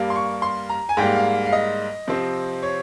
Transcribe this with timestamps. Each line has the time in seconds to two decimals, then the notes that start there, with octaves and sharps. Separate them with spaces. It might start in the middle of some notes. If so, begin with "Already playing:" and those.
Already playing: G2 G3 A#3
0.10 C6
0.16 C#6
0.42 C6
0.69 A#5
0.89 G#5
0.97 G#2 G3 A#3 G5
1.15 F5
1.46 F5
1.53 D#5
2.07 C3 F3 C4
2.63 C#5